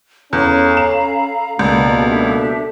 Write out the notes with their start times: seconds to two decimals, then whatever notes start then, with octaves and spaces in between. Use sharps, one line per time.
0.33 E2 C#4 A4 F5 A#5 B5
0.77 E7
1.59 C#2 B2 A#3 D5 A5 A#5
2.09 D4 G4 A4 E5